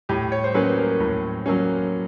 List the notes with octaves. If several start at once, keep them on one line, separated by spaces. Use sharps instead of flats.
A2 G4
C#5
C5
F#3 A#3 C#4 B4
A#4
A2
F#3 A#3 C#4